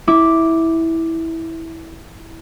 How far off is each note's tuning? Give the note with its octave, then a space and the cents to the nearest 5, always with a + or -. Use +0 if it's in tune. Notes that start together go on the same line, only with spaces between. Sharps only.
E4 -10 D6 +0